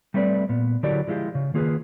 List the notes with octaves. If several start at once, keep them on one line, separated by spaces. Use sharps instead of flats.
G3 A3 C4 B4 C5 D5
A#2 B3
D3 F#3 E4 G4 A#4 D5
F3 G#3 E4 F4 G4
C#3
D#3 A#3 F4 G#4 A4 B4